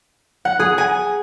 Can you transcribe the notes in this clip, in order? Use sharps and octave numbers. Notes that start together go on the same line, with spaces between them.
F#5
G#4
G#5